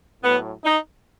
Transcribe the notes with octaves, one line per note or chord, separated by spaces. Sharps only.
A2 F#3 B3
D#4